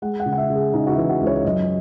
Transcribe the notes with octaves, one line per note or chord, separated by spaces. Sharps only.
G#3 F#5
F#5
C#3
F#5
E5
C#3
G#4
C#3 D#4
F#4
E4
E3
F#4
C#2
C#5
F#2 D#5